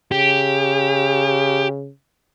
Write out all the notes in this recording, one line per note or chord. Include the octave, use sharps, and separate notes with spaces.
C#3 G4